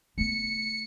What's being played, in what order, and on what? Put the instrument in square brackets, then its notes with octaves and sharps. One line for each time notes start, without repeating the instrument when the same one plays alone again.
[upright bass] A3 B3 [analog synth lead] C#7